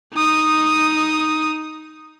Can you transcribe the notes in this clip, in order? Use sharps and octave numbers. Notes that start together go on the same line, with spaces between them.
D#4 D#6